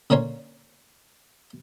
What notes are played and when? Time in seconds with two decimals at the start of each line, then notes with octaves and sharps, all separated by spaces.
0.10 D3 A#3 C#4 C#5 C6